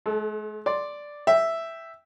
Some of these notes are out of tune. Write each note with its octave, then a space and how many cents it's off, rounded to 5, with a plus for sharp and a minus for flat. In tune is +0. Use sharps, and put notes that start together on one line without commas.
G#3 +45 A4 -20
D5 +0 C6 +5
E5 +0 G5 +0